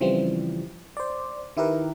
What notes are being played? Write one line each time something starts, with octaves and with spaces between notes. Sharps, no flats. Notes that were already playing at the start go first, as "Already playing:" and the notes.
C#3 E3 F3 G3 C4
C5 D5
D#3 E4 G4 A#4 B4